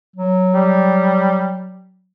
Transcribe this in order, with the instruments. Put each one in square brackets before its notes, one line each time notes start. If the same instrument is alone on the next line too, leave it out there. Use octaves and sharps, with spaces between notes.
[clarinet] F#3
[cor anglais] G3